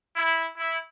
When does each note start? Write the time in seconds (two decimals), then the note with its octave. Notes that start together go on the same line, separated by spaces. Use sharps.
0.16 E4
0.58 E4